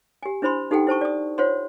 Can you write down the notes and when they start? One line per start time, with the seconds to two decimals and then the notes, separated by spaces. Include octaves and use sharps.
0.23 G4 G#5
0.42 D4 E4 C5 B5 C6
0.71 D#4 G4 A4 F#5 G5
0.87 E4 C5 A5 C#6
1.01 D5 D#6
1.38 F4 C5 C#5 F#5 C6